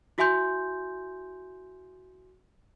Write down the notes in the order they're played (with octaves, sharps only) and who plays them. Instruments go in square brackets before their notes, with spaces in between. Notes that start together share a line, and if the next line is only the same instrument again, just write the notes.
[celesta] E4 F#4 E5 G#5 C6 G6